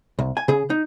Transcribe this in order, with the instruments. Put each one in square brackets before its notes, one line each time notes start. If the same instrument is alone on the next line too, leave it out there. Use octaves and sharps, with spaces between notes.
[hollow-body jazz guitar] C2
G#5
C#3 G#4
D#4